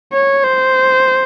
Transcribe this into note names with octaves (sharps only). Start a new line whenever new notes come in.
C#5
C5